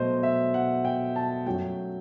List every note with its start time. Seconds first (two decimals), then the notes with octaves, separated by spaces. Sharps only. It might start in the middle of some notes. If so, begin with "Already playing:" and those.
Already playing: B2 F#3 A3 C5 D#5
0.23 E5
0.54 F#5
0.85 G5
1.16 A5
1.46 F#2 F#3 A3 G5